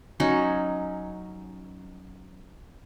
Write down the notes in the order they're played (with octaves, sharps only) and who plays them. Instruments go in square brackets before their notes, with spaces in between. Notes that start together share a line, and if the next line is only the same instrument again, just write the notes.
[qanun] F#3 C#4 D#4